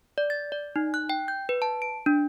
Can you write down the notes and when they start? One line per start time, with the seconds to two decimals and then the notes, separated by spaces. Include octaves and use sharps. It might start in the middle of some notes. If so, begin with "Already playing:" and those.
0.18 D5
0.30 A6
0.52 D5
0.76 D#4
0.94 F#6
1.10 G5
1.28 G6
1.49 B4
1.62 A5
1.82 D7
2.06 D4